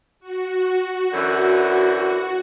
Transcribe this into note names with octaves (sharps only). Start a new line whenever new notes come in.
F#4
F#2 D3 E3